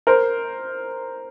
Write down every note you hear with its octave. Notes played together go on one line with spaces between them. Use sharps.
A#4 C5